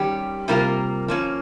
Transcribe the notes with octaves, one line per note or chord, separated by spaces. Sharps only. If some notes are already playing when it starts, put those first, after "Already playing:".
Already playing: D#3 G3 C#4 G4
C3 G3 A#3 F4 A#4
F3 A#3 C#4